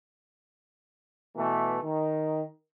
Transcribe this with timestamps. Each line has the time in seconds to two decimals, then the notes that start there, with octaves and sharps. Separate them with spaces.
1.36 B2 E3 A3
1.83 D#3